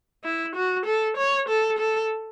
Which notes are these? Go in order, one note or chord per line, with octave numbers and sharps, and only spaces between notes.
E4
F#4
A4
C#5
A4
A4